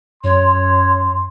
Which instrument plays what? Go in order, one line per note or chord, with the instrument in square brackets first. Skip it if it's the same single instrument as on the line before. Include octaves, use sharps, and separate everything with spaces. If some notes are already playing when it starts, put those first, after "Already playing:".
[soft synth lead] F#2 [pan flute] C#5 [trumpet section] C6